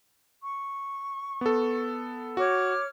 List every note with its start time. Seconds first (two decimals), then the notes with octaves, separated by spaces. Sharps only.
0.39 C#6
1.41 B3 A4
2.37 F#4 C#5 D6 F6